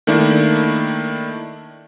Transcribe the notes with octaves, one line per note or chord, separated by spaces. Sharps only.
D#3 A3 A#3 D4 E4